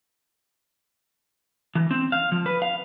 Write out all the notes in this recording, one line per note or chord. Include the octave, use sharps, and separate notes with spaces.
E3
C4
F5
F3
B4
F5